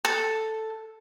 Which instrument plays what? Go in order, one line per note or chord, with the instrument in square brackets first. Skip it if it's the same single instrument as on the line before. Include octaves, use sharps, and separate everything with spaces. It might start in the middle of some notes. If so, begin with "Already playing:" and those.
[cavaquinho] A4